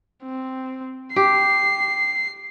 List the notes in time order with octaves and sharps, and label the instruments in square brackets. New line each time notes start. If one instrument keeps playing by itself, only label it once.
[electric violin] C4
[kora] G4 [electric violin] C7